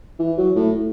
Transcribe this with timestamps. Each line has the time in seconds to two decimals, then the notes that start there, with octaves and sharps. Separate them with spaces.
0.19 E3
0.38 F#3
0.56 A2